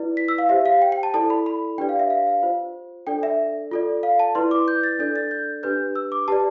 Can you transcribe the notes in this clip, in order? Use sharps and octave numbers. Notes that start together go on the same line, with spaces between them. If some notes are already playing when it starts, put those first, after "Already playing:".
Already playing: E4 B4 D5
B6
E6
F5
G4 C5 E5
F5
G5
G5
A5
E4 A4 D5 A5
B5
B5
D4 G4 B4 D5 G5
F5
E5
F5
F5
F4 C5
D4 A4 D5 G5
E5
F4 A4 D5
F5
A5
E4 B4 D5 C6
D6
G6
A6
D4 A4 D5 G6
A6
G6
D4 G4 B4 G6
E6
D6
G4 B4 D5 A5